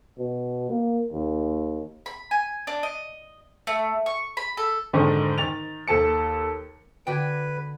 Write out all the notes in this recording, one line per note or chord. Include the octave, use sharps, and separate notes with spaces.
B2
A#3
D#2
B5
G#5
D4
D#5
A3
C#6
B5
A4
F2 G#2 D3 D#3
D#3 A6 F7
D#2 A4 A5 C#7
D3 F#4 B4 D5 G5 G#6